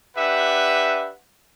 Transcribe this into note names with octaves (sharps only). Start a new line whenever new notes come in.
D4 G4 B4 E5 F#5